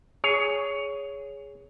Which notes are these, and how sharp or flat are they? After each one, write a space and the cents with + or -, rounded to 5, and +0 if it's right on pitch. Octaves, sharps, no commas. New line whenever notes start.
G#4 +0 C#5 +15